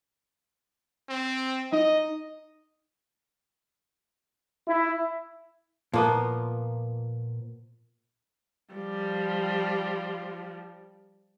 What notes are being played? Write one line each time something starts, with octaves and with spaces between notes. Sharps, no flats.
C4
D#4 D#5
E4
A#2 F3 A#3 B3
F3 G3